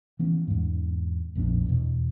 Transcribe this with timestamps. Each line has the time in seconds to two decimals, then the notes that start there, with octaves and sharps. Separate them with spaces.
0.19 E3 B3 C#4
0.48 E2 G#2
1.35 A#1 F2 B3 D4
1.66 E2 B2